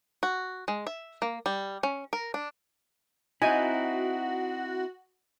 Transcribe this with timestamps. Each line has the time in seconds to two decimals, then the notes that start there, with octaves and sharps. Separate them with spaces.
0.23 F#4
0.68 G#3
0.87 E5
1.22 A#3
1.46 G3
1.83 C#4
2.13 A#4
2.34 D4
3.42 C4 D#4 E4 F#4 G#5